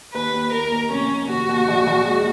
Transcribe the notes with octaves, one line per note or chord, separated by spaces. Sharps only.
D#2 B4
D#2
D#2 A#4
D#2
F1 C#4
F1
D#2 F#4
D#2
A#1
A#1
G#3